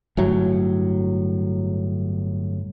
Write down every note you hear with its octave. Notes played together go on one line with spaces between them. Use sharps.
G1 A2 F#3